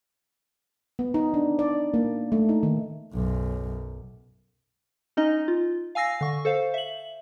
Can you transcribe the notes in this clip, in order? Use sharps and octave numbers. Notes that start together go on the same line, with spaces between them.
B3
D#4
D4
D5
A#3
A3
D#4
D#3
B1 F#2
C#4 D#4 D#5
F4
F5 G#5 E6 A#6 C7
D3 C#6
A4 C5 F5
E5 F#7